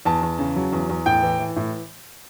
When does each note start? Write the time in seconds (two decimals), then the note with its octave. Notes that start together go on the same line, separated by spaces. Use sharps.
0.05 E2 A5
0.22 E2
0.39 C#3
0.56 F#3
0.72 E2
0.89 E2
1.06 A2 G5
1.23 E3
1.39 E3
1.56 A2